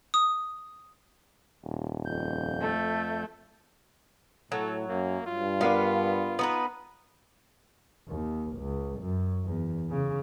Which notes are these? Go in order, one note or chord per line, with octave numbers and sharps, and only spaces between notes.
D#6
D#1
F2 G6
A3
A2 F#3 A4
F#2 A#3
G2 F4
B3 D4 A#4 F5
B3 D#4 B4
D#2
C#2
F#2
E2
C#3